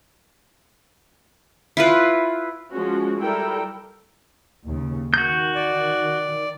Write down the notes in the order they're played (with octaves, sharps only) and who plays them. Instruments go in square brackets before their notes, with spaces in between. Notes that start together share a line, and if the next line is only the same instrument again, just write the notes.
[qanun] E4 F4 B4
[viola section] F3 G#3 C#4 F#4
G3 E4 A4 A#4 G5
[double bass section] D#2 C#3
[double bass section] D#3 [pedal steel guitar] F#4 G6
[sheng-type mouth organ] D5